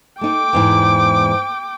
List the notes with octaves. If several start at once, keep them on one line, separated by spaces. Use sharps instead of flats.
A3 D#4 G5 D6
E2 G#2 E3